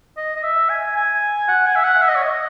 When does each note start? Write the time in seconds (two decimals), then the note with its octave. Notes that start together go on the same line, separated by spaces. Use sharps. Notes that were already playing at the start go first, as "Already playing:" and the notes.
0.17 D#5
0.36 D#5
0.43 E5
0.69 G#5
0.96 G#5
1.48 F#5
1.66 G#5
1.75 E5
1.84 F#5
2.02 E5
2.08 D#5
2.16 C#5
2.23 D#5